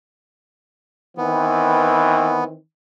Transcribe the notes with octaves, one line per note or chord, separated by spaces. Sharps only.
D#3 E3 B3 C4